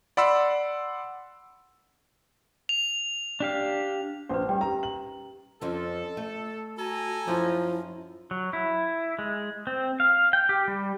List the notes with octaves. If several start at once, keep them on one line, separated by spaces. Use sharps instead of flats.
D5 F#5 B5 C6 E6
F7
D4 G4 F5
A#1 C#4 B4 C5
G3 G4 G5
A#4 A#5
F#7
F2 F3 C#4 A4
A3
F#4 A4 G#5 A#5
F#2 F3 E4
F#3
E4
G#3
C4
F5
G5
G4
G3